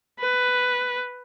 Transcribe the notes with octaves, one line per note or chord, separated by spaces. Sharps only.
B4